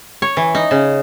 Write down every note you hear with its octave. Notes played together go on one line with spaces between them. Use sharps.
C#5
E3
D#4
C#3